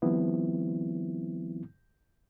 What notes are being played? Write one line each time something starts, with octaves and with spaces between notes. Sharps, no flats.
D#3 F3 G3 B3 C4 E4